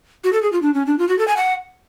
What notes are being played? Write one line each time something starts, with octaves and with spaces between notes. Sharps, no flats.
F#4
A4
G#4
F4
D4
C#4
D4
F4
F#4
A4
G#5
F#5